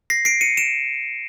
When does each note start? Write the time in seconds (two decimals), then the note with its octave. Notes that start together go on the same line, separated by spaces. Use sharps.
0.10 A#6 C7
0.25 C7 D7
0.41 C#7 D#7
0.57 D7 E7